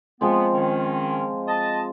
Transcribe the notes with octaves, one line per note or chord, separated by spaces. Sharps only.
F3 G#3 B3 C4
D#3 C#4
D#5 A5